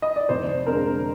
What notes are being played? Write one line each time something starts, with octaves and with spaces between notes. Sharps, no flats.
D#5
D5
F1 C5
F2 D3 G#3 A#4